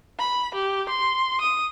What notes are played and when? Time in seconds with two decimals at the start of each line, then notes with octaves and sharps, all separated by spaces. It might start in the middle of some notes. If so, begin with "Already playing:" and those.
0.19 B5
0.54 G4
0.89 C6
1.41 D#6